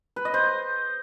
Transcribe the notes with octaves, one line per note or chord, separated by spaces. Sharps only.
B4
D#5
C5